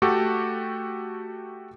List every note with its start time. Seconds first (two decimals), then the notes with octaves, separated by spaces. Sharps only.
0.02 A3 F#4 G4 A4